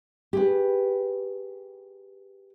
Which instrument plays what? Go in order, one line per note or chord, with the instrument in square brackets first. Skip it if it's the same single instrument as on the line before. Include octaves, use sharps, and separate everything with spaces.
[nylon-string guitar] G4 G#4 B4